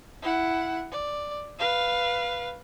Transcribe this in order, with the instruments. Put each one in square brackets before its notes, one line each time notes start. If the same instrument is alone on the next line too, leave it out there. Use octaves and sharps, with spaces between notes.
[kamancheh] E4 F#5
D5
B4 F5